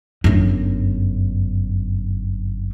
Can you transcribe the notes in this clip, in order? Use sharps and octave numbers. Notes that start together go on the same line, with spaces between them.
G1 F#2